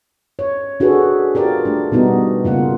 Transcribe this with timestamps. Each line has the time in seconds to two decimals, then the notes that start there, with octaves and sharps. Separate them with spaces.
0.39 C#5
0.80 D4 F#4 G#4 A4 B4
1.35 F4 G4 A#4 D5
1.65 A3 D4
1.92 B2 G3 B3 D#4 F#4
2.44 C#3 A#3 F4 F#5